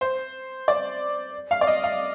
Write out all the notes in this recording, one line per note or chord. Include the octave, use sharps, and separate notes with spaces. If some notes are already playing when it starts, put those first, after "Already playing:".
C5
D5
F5
D5
D#5
F5